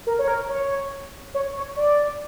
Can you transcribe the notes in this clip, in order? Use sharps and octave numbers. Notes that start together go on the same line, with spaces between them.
A#4
C#5
A#4
C#5
C#5
C#5
D5